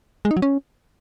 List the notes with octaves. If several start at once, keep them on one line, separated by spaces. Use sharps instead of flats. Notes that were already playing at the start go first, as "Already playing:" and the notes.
G#3
D#4
F#3
C#4